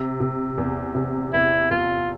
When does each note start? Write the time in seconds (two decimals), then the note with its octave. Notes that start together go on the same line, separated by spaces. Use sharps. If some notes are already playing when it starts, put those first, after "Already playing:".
Already playing: C3
0.20 C3
0.58 E2
0.95 C3
1.33 E2 E4
1.71 E2 F4